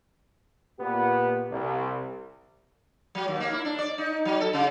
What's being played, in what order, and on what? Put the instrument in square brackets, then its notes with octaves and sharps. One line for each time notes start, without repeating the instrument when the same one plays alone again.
[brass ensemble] A#2 B3 G4
C2
[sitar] F#3
D#2
A#3
E4
D4
D5
D#4
F#3
A4
C#3